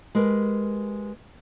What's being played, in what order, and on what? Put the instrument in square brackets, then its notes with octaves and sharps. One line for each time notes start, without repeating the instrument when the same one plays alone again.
[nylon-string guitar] G#3 G4 A#4 B4